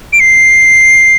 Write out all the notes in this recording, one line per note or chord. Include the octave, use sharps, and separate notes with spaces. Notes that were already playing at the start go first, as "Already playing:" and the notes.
D7
C7